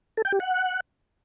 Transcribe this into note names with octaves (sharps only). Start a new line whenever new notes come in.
A4
G5
G4
F#5